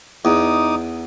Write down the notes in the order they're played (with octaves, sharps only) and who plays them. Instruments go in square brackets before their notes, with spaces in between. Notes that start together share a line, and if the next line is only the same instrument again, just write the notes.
[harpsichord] E2 [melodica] D#4 D6 D#6